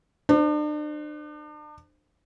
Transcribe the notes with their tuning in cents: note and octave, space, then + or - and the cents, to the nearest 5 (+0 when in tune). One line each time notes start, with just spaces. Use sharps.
D4 +40 C5 +0